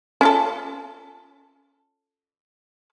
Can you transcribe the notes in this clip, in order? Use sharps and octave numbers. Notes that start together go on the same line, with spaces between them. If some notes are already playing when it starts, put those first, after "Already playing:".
C#4 F4 A4